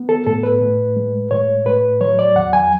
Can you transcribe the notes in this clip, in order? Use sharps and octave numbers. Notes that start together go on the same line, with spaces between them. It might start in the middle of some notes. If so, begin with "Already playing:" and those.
Already playing: B3
A4
A2 A4
B4
A2
G#3
A2 C#5
A2 B4
F#3 C#5
D5
E2 F#5
G#5